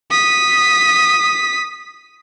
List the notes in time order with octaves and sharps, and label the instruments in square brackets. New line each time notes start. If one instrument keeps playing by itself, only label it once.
[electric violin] D#6 B6